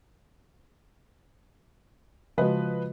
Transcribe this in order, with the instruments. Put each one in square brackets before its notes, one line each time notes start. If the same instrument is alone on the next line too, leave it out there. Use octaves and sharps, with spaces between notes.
[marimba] C#3 G#3 F#4 [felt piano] F3 B4 D#5